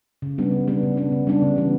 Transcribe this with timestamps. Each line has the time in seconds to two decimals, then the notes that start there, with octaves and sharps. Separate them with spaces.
0.22 C#3
0.38 G3 B3 D4
0.52 C#3
0.68 G3 B3 D4
0.83 C#3
0.97 G3 B3 D4
1.12 C#3
1.27 G3 B3 D4
1.42 C#3
1.56 E3 B3